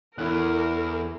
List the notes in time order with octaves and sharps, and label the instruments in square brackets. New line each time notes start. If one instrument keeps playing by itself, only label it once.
[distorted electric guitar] E2 [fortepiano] E4 F#6 [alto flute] A4 [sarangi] A#4